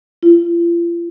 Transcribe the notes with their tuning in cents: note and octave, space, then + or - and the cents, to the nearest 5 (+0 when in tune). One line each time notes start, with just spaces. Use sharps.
F4 -40